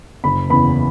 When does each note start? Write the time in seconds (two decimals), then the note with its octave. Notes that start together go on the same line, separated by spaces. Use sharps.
0.24 F#1 B5
0.50 E2 C#3 B5